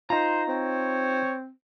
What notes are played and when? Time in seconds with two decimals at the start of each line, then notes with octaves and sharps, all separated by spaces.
0.10 D#4 F4 C5 A#5
0.48 C4 C#5